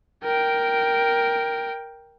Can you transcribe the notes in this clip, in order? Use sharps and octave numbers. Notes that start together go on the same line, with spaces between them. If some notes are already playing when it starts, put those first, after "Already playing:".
A#4 G5